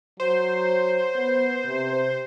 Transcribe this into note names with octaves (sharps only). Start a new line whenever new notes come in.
F#3 C5
B3
C3